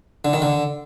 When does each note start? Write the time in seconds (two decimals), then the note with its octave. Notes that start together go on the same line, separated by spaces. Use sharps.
0.25 D3
0.33 D#3
0.42 D3